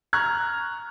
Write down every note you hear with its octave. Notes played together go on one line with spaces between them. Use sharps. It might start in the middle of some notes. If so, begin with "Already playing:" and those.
A#5 C#6 F6 F#6 G#6